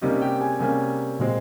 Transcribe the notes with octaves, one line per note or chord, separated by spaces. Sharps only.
C3 G3 A#3 C#4 D#4 D#5
G4 G5
G#4 G#5
C3 G3 A#3 C#4 G#4 G#5
A#2 G#3 C4